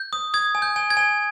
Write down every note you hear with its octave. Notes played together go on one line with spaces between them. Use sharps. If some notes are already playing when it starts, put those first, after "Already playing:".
Already playing: G6
D#6
D#6 G#6
G#5
G6
G#5
G#6
G#5